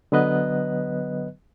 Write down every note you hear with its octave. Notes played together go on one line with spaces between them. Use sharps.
D3 F#3 B3 B4 D#5 F#6